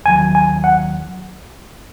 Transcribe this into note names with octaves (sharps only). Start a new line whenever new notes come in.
D#2 D#3 F#3 G#5
G#5
F#5